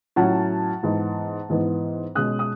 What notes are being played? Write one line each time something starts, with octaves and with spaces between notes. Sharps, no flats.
A2 F#3 C#4 F#5 A5
G#2 E3 B3
G#2 E3 B3
B2 G#3 C#4 D#6 F#6
D#6